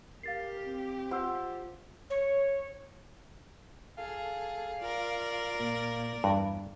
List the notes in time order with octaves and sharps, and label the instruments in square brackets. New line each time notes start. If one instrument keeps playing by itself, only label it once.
[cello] G4 [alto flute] A#4 [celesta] F5 A6 C7
[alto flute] C4
[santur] F4 C5 [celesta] F#5 E6
[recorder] C#5
[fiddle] G#4 [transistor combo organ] A4 [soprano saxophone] F5
[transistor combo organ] F4 [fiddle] A#4 D5
[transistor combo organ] A#2 A#3
[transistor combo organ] E2 [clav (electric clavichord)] G2